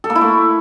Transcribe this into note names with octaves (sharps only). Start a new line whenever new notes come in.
A4
A#3
E4
A3